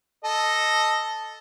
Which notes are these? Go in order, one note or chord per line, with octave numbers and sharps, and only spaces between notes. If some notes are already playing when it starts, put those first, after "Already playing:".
A4 D#5